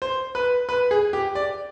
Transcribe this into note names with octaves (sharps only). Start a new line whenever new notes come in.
C5
B4
B4
G#4
G4
D5